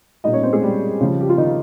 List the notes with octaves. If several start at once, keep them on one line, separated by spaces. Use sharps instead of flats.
A#2 G3 D#4 D#5
C#4 C#5
C4 C5
G#3 G#4
G3 G4
C#3 F3
G4
F4
D#3 D#4